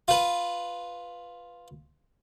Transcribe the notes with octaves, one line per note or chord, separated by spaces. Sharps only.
F4 B4